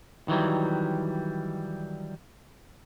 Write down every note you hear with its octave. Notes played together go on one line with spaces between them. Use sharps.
D#3 E3 F#3 G3